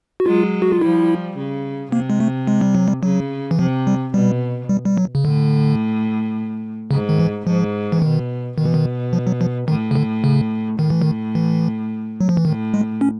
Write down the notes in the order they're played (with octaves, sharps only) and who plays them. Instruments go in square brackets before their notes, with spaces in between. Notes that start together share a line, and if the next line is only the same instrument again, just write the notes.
[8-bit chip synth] F#4
[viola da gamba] F#3 G#3 [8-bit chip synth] F4
[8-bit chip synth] F#4
F4
[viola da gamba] F3 G3 [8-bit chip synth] E4
[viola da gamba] C#3
[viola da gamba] C3 [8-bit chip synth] A#3
[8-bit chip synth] G#3
A3
G#3
G3
F#3
G3
[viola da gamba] C#3 [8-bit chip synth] F#3
[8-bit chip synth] E3
[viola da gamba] C3 [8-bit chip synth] F3
[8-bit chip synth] G3
[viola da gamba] B2 [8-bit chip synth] G3
[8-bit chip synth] G3
G3
F#3
C#3
[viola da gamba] A2 [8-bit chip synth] D3
[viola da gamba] G#2 [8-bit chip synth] C#3
[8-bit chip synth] D#3
E3
[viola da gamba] G#2 [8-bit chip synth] F3
[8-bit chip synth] E3
[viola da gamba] B2 [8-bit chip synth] D#3
[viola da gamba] B2 [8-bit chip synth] D#3
[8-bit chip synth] E3
D#3
F3
F#3
F3
[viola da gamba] A2 [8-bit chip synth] D#3
[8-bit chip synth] C#3
D3
C#3
[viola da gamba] A2 [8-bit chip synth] D#3
[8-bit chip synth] E3
D#3
E3
F#3
F3
E3
[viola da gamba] A2 [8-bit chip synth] D#3
[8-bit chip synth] G#3
C#4